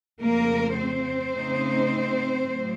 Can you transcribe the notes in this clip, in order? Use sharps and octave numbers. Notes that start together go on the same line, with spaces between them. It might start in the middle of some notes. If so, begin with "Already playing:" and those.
F2 C#3 A3 A#3 A#4
C4 C5
C#3 A3 D#4
A2 F#3